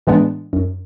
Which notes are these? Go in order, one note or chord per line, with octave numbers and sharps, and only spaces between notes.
A2 E3 G#3 B3 D4
F#2